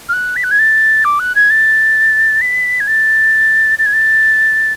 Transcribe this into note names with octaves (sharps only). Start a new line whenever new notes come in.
F6
F#6
B6
F#6
G#6
A6
D6
F#6
G#6
A6
B6
G#6
A6
A6
G#6
A6